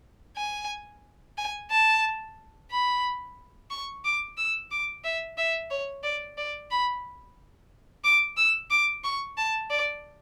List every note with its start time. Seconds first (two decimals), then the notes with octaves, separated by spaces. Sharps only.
0.37 G#5
1.38 G#5
1.71 A5
2.71 B5
3.71 C#6
4.04 D6
4.37 E6
4.71 D6
5.04 E5
5.37 E5
5.70 C#5
6.03 D5
6.38 D5
6.71 B5
8.04 D6
8.37 E6
8.71 D6
9.04 C#6
9.37 A5
9.70 D5